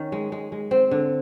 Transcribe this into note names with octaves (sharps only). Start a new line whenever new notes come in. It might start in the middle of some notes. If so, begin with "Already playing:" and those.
Already playing: D#3 C#4
G#3
G#3
G#3
C4
D3